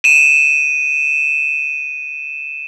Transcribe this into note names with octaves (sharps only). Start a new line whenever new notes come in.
D#7 E7